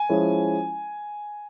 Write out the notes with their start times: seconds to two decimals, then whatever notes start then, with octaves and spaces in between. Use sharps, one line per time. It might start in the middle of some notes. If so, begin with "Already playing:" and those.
Already playing: G#5
0.09 F3 G#3 C#4 E4